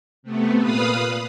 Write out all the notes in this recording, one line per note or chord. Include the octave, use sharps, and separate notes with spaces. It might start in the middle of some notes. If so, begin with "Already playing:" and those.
C3 A3 B3
A#2 B4 F5 B5 D#6